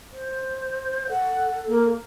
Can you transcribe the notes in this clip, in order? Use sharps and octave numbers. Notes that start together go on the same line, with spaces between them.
C5
A4 F#5
A#3